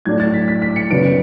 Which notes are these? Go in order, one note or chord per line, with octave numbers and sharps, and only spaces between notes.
A2 F#3 A3 D4 G#6
A6
B6
B6
B6
C#7
F#2 C#3 F#3 B3 D4 D7